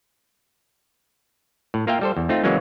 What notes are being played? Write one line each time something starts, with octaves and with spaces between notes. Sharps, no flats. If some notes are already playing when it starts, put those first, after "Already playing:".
A2
A#3 F4 A#4 E5 F5 G5
G3 A4 C5
E2
A3 C4 D#4 F4
C#3 E3 F#3 G#3 A#3 C#4